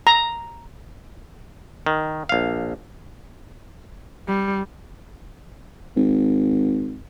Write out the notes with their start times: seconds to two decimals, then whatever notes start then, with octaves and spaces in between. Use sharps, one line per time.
0.07 A#5
1.86 D#3
2.29 A#1 F5
4.28 G3
5.96 G#1